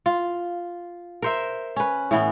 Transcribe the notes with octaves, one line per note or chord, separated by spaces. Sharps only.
F4
A#4 C5 E5
C#4 B4
A2 E3 B3